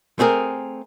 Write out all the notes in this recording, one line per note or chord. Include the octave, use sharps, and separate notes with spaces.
A3 C4 G#4 A#4